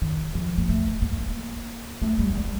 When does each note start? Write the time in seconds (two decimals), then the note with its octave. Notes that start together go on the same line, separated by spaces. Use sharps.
0.02 D#3
0.35 F3
0.58 A#3
0.69 A3
1.02 A#3
2.02 A3
2.19 G3
2.35 G3